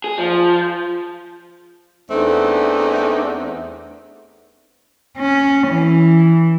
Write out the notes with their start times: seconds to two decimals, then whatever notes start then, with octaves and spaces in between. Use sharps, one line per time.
0.04 G#4
0.18 F3
2.10 E2 A3 C4 D4 D#4
5.19 C#4
5.69 E3